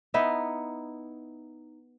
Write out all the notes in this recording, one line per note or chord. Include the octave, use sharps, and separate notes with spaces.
B3 D#4 E4 E5